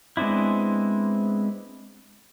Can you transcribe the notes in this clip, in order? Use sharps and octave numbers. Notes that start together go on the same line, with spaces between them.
G#3 B3 C4 D4 E4